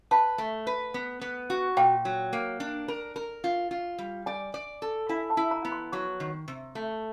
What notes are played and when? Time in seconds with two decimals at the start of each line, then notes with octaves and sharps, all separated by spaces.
0.11 B4 A5
0.38 A3
0.67 B4
0.94 B3
1.21 B3
1.50 F#4
1.77 A#2 G5
2.05 F#3
2.33 A#3
2.60 D4
2.88 A#4
3.16 A#4
3.44 F4
3.71 F4
3.98 G3
4.26 D5 G#5
4.54 D5
4.82 A4
5.09 E4 G#5
5.30 A5
5.37 E4
5.51 A#5
5.65 B3
5.72 C6
5.92 F#3 C#6
6.20 D#3
6.48 C3
6.75 A3